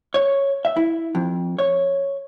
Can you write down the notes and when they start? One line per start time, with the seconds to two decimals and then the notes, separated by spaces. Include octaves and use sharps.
0.14 C#5
0.65 E5
0.77 E4
1.15 F2
1.58 C#5